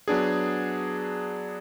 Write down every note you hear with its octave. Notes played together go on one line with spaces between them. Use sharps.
F#3 B3 D4 G#4